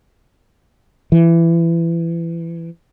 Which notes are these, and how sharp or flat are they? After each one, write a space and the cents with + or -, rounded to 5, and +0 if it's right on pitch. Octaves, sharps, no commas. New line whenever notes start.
E3 +25